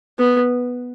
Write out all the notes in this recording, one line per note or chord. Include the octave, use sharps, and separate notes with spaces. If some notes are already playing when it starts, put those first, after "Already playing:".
B3